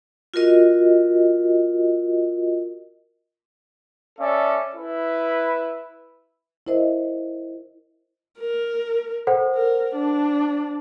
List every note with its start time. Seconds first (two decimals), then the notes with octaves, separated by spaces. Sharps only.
0.34 F4 F#4 A#4 D#5
4.20 C#4 A4 D5 E5
4.75 E4 B4
6.67 E4 A#4 C5 D#5 E5
8.39 A#4
9.27 A4 C5 F#5
9.56 A#4
9.96 D4